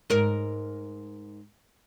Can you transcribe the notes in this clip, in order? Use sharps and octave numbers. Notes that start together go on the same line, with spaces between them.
G#2 A#4